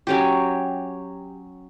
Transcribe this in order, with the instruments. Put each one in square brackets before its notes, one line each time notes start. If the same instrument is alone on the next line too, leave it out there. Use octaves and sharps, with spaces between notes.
[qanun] F#3 C#4 G4